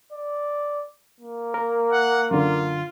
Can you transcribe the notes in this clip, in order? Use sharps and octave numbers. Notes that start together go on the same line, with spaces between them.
D5
A#3
A#4
F#5
F#2 D3 F4